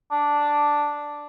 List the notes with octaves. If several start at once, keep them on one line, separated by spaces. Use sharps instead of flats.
D4